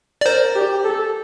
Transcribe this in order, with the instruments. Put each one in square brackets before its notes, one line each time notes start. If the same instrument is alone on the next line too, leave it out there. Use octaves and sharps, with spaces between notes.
[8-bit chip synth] D5
[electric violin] A#4 [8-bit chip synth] C5
[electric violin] G4
A4